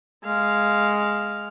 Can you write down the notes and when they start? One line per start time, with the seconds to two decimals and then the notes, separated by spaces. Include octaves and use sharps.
0.24 G#3 F5